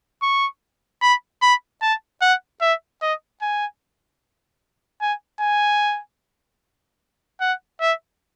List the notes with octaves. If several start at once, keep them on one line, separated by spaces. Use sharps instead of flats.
C#6
B5
B5
A5
F#5
E5
D#5
G#5
G#5
G#5
F#5
E5